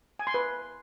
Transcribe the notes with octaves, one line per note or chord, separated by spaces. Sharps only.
G#5
C6
B4